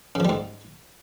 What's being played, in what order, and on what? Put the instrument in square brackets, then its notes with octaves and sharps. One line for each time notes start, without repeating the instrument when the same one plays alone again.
[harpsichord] C#3
F3
G3
G#2